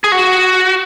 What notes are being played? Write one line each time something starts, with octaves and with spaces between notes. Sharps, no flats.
G#4
F#4